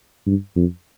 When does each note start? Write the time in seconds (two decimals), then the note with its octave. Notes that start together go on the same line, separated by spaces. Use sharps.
0.26 G2
0.55 F2